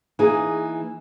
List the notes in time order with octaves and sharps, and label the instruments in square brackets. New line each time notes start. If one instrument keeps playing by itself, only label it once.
[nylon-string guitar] E3 A#3 D#4 G#4